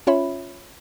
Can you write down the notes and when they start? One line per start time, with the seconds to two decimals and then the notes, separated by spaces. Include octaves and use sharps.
0.07 C#4 F4 C#5 E5 B5